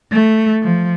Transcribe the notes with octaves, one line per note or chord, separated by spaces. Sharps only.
A3
F3